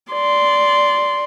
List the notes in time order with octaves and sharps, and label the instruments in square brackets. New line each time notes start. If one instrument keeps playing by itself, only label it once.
[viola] D5 C6